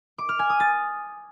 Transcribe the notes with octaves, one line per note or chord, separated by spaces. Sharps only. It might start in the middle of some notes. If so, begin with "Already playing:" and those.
D6
F6
G#5
D#6
A6